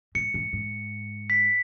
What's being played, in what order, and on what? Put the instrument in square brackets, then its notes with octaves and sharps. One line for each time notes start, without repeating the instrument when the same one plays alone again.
[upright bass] G#2 [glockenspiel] C#7
[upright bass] G#2
G#2
[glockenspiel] B6